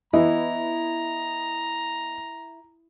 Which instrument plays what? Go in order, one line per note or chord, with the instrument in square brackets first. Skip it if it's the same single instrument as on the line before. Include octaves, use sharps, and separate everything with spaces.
[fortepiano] E3 [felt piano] B3 D#5 [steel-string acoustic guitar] E4 [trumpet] A#5